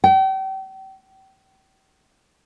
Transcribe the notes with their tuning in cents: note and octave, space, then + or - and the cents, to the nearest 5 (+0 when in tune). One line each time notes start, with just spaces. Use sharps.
G5 -35